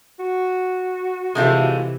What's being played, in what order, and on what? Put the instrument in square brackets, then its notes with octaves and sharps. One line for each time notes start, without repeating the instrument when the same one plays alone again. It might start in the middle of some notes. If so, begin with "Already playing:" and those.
[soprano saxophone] F#4
[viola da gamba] C3 E3 [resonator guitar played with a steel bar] G#3 A3 F4